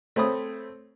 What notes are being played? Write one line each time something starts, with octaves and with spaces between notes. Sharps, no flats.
A3 C4 C#5 B5 D#6